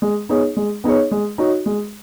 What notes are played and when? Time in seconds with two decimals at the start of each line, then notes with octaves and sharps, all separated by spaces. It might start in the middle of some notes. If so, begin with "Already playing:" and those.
0.02 G#3
0.29 B3 D#4 G#4 C#5
0.57 G#3
0.84 B3 D#4 G#4 C#5
1.11 G#3
1.38 D#4 F#4 C#5
1.66 G#3